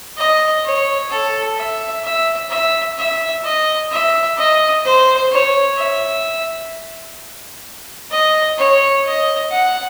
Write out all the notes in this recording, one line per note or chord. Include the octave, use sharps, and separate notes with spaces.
D#5
C#5
A4
E5
E5
E5
E5
D#5
E5
D#5
C5
C#5
E5
D#5
C#5
D#5
F#5